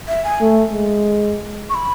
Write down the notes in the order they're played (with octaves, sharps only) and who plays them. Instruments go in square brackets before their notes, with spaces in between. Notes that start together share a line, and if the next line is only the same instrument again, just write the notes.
[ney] E5
G#5
[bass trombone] A3
G#3
[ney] C#6
B5